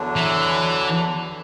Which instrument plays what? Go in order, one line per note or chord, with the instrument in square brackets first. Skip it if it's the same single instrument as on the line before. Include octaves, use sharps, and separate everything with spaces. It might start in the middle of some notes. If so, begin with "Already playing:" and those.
Already playing: [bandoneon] E2 D3 F#3 D4
[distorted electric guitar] E3